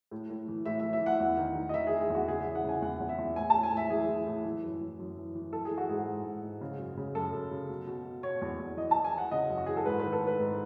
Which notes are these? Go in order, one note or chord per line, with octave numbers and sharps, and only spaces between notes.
A2
A2
E3
A2 E5
E3 E5
E5
E3 F#5
E2
D#3
D#3
D#5
D#3 E5
D#3 G#4
G#4
E2 F#4
C#3 G#4
E3 E5
F#5
C#3 G#5
E2 F#5
E2
E5
E2
A2 G#5
A2 A5
G#5
A2 E5
E3 G#4
E3
A2
E3
F#2
E3
F#2
E3
E3
E3 A4
G#4
E3
F#4
G#2 G#4
G#2
G#2
G#2
C#3
F#2
C#3
F#2 A4
F#2
C#3
B2
B2
B2
B2 C#5
E2
E2
E3 D#5
E3 A5
G#5
E3
F#5
C#3 D#5
F#2
F#4
E3 G#4
A4
G#2 B4
D#3 B4
A4
D#3 B4
G#2